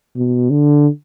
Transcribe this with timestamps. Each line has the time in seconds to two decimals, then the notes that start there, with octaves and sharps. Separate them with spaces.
0.16 B2
0.51 D3